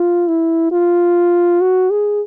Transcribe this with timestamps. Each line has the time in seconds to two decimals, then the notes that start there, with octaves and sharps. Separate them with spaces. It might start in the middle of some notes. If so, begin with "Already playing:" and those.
Already playing: F4
0.28 E4
0.72 F4
1.61 F#4
1.90 G#4